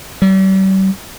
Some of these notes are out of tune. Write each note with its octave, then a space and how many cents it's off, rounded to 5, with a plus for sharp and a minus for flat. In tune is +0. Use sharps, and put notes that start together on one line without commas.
G3 -40